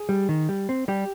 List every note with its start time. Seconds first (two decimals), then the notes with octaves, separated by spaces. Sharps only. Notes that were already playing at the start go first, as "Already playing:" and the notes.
Already playing: G#4
0.09 G3
0.29 D#3
0.49 G3
0.69 C4
0.88 G3 G4